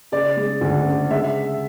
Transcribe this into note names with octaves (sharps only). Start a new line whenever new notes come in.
C#3 D5
G#3
D2
C#3
G#3 E5